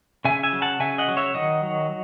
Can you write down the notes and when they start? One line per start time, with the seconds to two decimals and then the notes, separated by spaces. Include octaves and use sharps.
0.25 C#3 E5 G#5
0.43 E5 G#5
0.53 F#3
0.62 F#5 A5
0.80 C#3 E5 G#5
0.98 D#5 F#5
1.08 F#3
1.17 C#5 E5
1.35 D#3 D#5 F#5
1.63 F#3